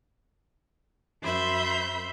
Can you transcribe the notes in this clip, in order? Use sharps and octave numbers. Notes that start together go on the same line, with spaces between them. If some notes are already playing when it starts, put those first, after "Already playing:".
F#2 C5 E5 B5 G6